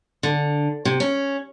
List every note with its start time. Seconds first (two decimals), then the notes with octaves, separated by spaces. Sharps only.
0.23 D3
0.85 C3
1.00 C#4